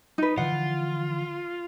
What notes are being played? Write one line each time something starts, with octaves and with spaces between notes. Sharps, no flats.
D#4 B4
D3 E3 F3 F4 F#5